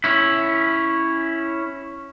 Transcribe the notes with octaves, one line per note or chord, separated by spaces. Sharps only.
C#4 E4